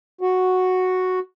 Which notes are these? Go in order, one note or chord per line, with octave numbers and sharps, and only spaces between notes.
F#4